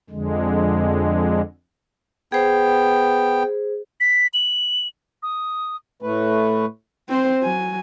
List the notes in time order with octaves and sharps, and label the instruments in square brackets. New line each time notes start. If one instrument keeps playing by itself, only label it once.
[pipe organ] F2 D3 G#3
[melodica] B3 G5 [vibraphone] G#4 C5
[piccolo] B6
F#7
D#6
[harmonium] A2 A3 B4
[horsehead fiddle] C4 C5
F#3 G#5